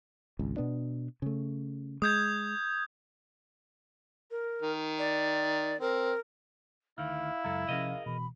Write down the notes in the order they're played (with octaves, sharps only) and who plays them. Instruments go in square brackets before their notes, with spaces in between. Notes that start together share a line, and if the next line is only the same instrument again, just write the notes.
[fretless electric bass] G#1 C#2
B2 B3 D4
C#3 A3
[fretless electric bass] G#3 [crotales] D#6 G6 G#6
[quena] A#4
[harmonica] D#3
[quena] D5
[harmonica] C4 [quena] A#4
[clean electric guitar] D2 D#3 [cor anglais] E4 [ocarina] F5 [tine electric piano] F6
[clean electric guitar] C#2 F#2 A4 [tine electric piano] A#5 G#6
[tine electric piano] C3 F3 C#4 [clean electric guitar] G#4 A#4 D#5
[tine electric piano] B2 E3 [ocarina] B5